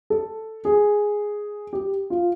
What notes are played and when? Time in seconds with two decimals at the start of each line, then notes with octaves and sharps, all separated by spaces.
0.10 A4
0.65 G#4
1.73 G4
2.10 F4